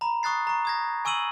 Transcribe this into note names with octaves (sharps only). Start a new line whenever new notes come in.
A#5 B5
C#6 D#6 F#6 A6 C7
A#5 C#6
D#6 G#6 A#6
G#5 C#6 E6 D#7 F#7